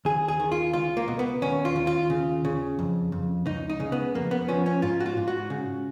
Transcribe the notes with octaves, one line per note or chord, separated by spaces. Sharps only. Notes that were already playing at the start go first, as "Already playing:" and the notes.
D#2 G#4
G#4
D#3
F4
C#2 F4
A#3
B2
B3
D#2 C#4
F4
D#2
F4
C#3
C#3
F2
F2
C#2 D#4
D#4
C#3
B3
F2 A#3
B3
F3 C#4
C#4
G#2 F4
F#4
F4
G#2
F#4
C#3